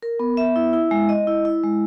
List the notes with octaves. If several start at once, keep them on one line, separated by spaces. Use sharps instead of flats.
A#4
B3
E5
E4
E4
G#3
D#5
E4
E4
G#3